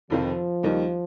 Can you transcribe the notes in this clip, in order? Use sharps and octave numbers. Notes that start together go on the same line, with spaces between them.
F1 F2 D#3 F3 C4 F4
D#2 D#3 G3 D#4